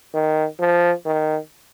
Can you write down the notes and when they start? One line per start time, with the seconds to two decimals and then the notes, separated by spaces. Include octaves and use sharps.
0.14 D#3
0.60 F3
1.05 D#3